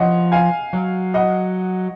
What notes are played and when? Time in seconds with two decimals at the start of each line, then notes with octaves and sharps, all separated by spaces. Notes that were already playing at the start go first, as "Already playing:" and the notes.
Already playing: F3 C#5 D#5 F#5
0.32 F5 G#5
0.73 F#3
1.14 D#5 F#5